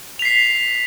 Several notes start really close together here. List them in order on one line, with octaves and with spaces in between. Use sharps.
F7 B6 C7